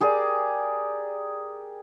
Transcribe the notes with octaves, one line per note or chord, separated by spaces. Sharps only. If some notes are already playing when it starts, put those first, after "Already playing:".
G4 G#4 A#4 D5